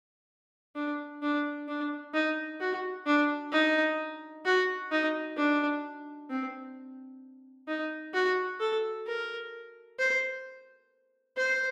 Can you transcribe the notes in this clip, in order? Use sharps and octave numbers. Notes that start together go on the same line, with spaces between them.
D4
D4
D4
D#4
F#4
D4
D#4
F#4
D#4
D4
C4
D#4
F#4
A4
A#4
C5
C5